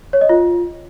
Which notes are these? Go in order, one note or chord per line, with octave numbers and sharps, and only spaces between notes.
C#5
D#5
F4